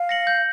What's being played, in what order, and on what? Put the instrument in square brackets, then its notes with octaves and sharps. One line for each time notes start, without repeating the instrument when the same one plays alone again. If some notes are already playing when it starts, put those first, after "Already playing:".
Already playing: [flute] F5
[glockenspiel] A#6 C#7 F#7
G6